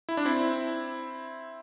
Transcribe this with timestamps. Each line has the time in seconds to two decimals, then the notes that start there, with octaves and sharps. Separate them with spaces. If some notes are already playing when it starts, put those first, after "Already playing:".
0.09 E4
0.17 D4
0.25 C4 E4